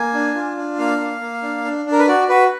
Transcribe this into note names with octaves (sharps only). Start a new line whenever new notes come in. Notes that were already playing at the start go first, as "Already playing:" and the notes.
Already playing: A#3 G#5
D4
F4
D4
A#3 F5
A#3
A#3
D4
D4
D4
A#4
B4
F#4 D5
F#4 B4